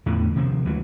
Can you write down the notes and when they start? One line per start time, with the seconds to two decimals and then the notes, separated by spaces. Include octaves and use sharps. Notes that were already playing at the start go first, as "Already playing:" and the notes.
0.06 E2 A2 D3 D#3
0.36 C3 D#3 F3
0.65 D2 E3 F#3 G#3